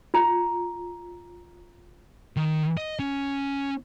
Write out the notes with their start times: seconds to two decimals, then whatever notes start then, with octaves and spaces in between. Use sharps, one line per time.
0.14 F4 A#5
2.37 D#3
2.77 D#5
2.99 C#4